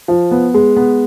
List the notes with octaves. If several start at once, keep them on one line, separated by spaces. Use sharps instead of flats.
F3
B3
G#3
B3